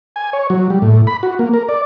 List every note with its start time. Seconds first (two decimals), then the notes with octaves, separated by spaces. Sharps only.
0.16 G#5
0.33 C#5
0.50 F#3
0.70 G3
0.82 A2
1.07 B5
1.23 F#4
1.39 A#3
1.54 A#4
1.69 D5